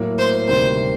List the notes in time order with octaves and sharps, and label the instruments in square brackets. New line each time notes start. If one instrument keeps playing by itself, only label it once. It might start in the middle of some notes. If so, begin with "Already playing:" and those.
Already playing: [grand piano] A2 F#3 A#3
[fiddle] C5
[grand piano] D2 C3 D#3 G3 A#3 [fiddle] C5